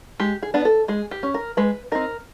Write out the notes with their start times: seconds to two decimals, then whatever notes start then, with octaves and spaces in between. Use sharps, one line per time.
0.20 G#3 G4
0.43 G#4
0.54 B3 D4
0.65 A4
0.88 G#3 G#4
1.11 G4
1.23 C#4
1.34 A#4
1.57 G#3 B4
1.92 C4 D#4 A#4